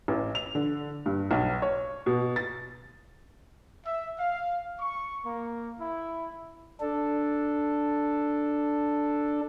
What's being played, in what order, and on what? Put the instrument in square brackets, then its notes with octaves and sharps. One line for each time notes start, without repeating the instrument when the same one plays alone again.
[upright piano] A1
F7
D3
G2
B1
C#5
B2
A6
[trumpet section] E5
F5
C#6
A#3
E4
[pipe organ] D4 A4